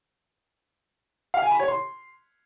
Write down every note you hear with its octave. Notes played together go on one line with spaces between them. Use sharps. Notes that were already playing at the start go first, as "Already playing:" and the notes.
F5
G#5
B5
C#5
C6